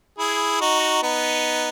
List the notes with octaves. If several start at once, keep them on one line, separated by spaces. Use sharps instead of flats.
E4 G#4
D#4 F#4
B3 D#4